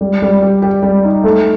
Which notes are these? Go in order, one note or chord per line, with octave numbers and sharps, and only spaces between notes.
G3
G3
G4
G4
G3
D#4
A3